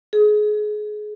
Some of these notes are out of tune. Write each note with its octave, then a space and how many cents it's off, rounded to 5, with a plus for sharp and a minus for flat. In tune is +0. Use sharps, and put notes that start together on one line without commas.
G#4 +25